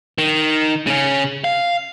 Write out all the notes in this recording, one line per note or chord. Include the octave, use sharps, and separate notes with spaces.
D#3
C#3 C#4
F5